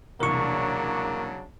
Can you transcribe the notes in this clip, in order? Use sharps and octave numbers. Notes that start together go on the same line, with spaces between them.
E1 C2 C#3 F#3 A#3 D4 A#4 C#6